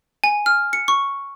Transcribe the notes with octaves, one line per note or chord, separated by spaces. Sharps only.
G#5
F6
C#7
C#6